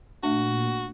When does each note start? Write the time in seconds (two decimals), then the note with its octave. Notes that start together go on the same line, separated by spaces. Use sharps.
0.23 A#2 A3 D4 F#4